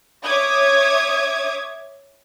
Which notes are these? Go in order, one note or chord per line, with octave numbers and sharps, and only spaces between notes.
C#5 E5 D6 D#6 G#6